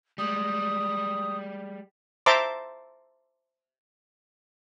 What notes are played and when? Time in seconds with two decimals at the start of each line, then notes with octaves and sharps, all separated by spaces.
0.18 G3 G#3 D#6
2.26 C5 E5 A5 A#5 C6 D6